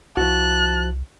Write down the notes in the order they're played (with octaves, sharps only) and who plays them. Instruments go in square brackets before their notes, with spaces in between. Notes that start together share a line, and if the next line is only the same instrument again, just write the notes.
[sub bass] C2 [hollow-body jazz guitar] F3 E4 F#4 [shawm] A5 [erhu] F#6